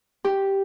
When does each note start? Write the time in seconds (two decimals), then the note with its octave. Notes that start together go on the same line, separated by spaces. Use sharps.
0.24 G4